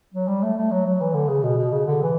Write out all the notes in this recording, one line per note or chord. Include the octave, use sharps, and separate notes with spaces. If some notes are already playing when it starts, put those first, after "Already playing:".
F#3
G3
A3
A3
F#3
F#3
E3
D3
C#3
B2
B2
C#3
D3
E3